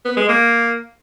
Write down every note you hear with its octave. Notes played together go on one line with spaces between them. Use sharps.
B3
G#3
A#3